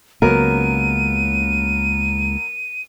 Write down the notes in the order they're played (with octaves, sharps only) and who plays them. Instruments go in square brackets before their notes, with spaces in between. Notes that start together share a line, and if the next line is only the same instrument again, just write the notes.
[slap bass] C#2 C#3 A#3 [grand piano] F#3 B3 A#4 [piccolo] D#7